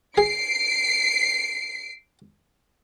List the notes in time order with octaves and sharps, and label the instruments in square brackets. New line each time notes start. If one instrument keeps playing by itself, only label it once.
[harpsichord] G#4 [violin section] C7 D7